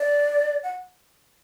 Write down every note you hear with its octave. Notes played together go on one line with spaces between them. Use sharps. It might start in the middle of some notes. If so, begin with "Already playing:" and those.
Already playing: D5
F#5